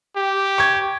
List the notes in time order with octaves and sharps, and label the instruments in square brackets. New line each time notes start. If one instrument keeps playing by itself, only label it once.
[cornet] G4
[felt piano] C#6 G#6